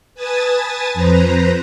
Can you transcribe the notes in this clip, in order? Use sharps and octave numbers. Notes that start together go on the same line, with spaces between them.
B4 G#5 A5 D#6 A6
F2 B4 C5 A#5